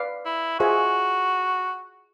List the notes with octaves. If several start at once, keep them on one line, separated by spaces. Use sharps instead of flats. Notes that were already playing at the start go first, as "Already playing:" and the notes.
Already playing: B4 D5 F5
E4
F4 F#4 G#4 C5 E5 G#5